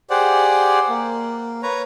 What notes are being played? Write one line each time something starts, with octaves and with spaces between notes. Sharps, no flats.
G4 G#4 C5 D5 F#5
A#3
B4 C#5 A#5